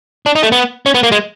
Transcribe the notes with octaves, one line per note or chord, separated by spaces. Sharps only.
D4
D#4
A3
B3
C#4
B3
A#3
G#3